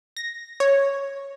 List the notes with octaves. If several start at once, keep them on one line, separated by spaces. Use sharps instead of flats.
A#6
C#5